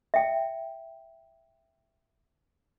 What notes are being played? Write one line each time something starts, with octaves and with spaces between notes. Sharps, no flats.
E5 G5